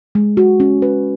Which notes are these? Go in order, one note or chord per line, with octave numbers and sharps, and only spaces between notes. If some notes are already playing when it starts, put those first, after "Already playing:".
G#3
F#4
C#4
B4